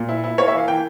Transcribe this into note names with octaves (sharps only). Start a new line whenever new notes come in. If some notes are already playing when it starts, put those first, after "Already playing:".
Already playing: A#2
E4
E4
A#3 C#5
E5
E3 F5
E3 G5